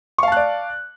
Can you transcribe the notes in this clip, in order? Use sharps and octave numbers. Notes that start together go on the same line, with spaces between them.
D5 F5 A5 C#6 F#6